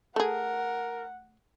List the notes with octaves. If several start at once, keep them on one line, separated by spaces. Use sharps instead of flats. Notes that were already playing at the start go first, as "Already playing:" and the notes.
A3 G#4 A#4 F#5